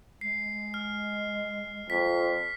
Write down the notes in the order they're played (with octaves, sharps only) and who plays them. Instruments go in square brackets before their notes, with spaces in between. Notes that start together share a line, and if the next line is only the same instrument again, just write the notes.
[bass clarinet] G#3 [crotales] C7
[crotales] F6
[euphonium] F2 [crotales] B6